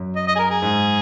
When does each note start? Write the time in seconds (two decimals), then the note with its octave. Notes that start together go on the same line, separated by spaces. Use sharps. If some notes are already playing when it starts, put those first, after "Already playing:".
Already playing: F#2
0.16 D#5
0.28 D#5
0.35 G#4
0.39 A#4
0.51 G#4
0.62 G#2